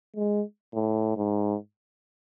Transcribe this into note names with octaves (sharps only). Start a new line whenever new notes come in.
G#3
A2
G#2